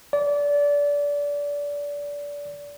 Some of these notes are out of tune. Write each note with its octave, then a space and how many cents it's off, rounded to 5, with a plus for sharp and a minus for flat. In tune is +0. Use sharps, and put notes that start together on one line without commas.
D5 -25